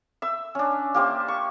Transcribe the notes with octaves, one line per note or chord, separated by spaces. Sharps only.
E5 E6
C#4 D4
A#3 G4 C5 E5
C#6